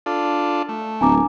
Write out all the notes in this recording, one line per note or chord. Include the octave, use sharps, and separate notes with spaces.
D4 F4 A4
A3
D1 G#5 A#5 D6